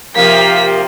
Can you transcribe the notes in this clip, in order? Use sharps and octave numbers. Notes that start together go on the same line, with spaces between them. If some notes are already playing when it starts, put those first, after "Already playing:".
C3 F3 A#3 G4 A#4 F5 B6